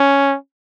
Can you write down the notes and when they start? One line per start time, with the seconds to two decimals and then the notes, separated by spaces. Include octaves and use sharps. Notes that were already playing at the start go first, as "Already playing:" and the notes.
Already playing: C#4